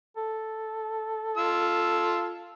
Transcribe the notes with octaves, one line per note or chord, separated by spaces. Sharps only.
A4
F4 E6